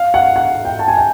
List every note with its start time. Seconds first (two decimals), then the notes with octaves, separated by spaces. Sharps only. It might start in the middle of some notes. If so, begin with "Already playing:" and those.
Already playing: F5
0.14 F#5
0.36 F#5
0.65 G5
0.79 A5
0.88 G#5
0.97 G5